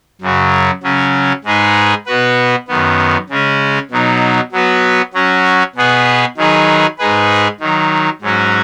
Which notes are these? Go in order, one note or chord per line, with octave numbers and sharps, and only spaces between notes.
F#2 C#3 F#3
C#3 F#3 C#4
G#2 G#3 D#4 G#4 B4
B2 B3 F#4 B4
F#2 D#3 B3
C#3 G#3 C#4
B2 F#3 D#4
F#3 B3 F#4 B4
F#3 C#4 F#4
B2 B3 G#4 B4
D#3 F#3 D#4 G#4 B4
G#2 G#3 D#4 G#4 B4
D#3 F#3 D#4
G#2 F#3 C#4 F#4